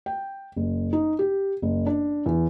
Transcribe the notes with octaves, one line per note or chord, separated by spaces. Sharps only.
G5
F#1
D#4
G4
F#1
D4
E2